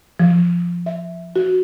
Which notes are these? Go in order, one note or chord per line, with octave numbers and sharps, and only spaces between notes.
F3
E5
F#4